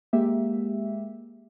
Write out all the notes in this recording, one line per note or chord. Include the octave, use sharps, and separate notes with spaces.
G#3 A#3 G4 E5